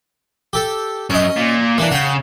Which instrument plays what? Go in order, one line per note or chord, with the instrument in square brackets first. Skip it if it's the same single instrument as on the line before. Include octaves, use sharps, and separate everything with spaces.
[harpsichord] G4 A4
[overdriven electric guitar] F#2 [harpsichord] C#4 D#5
[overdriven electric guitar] A#2
[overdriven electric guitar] E3 [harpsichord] A#3 D4
[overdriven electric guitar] C#3 [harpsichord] F#5 G5